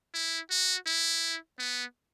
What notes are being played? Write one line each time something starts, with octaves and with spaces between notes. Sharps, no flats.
E4
F#4
E4
B3